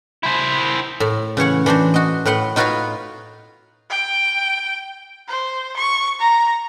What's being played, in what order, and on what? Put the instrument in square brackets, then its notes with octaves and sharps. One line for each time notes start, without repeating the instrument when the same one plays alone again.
[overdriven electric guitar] E4 C5
[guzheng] A2
C#3 E3 C#5 F#5
E3 D4 F#4 C5
F#4 D#5
A2 B4 F#5 C6
D#4 F4 F#4 B4 C#5 F5
[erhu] G5
C5
C#6
A#5